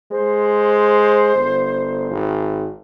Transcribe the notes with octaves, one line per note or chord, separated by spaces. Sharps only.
G#3 C5
G1
G#1